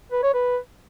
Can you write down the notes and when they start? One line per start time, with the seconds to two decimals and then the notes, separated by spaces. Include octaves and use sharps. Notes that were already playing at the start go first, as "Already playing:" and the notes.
0.12 B4
0.23 C#5
0.34 B4